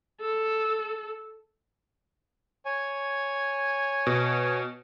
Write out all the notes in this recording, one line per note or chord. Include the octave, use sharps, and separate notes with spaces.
A4
C#5 G#5
B2